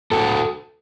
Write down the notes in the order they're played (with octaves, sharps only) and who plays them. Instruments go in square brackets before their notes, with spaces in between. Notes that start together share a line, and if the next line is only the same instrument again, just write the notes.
[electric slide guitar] A2 F#4 A4